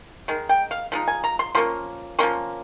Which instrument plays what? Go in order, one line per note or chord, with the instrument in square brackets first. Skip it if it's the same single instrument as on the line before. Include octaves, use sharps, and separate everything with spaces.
[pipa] D#3 G#3
G5
F5
F3 G#3 D#4
G#5
A#5
C6
F3 A#3 C#4 C6
F3 A#3 C#4 C6